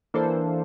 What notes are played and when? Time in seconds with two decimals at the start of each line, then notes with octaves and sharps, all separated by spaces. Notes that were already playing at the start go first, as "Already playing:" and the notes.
0.14 E3 A#3 D4 A4 C5